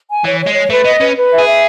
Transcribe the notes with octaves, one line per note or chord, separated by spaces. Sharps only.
G#5
E3 C#5
C#5
G#3
C#5
A3 B4
B3 D#5
C#4 B4
B4
E5
G#4
E5